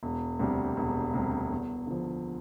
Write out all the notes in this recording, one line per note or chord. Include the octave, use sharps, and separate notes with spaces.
E1
D2 C3 G3
E1
D2 C3 G3
E2
D3 F3